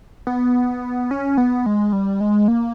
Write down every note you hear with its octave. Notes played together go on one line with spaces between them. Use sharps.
B3
C#4
B3
G#3
G3
G#3
A#3